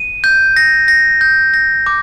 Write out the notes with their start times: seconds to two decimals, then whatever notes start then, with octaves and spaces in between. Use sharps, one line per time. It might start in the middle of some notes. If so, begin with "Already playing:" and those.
Already playing: D#7
0.24 G6
0.56 A#6
0.88 A#6
1.21 G6
1.54 A#6
1.86 D6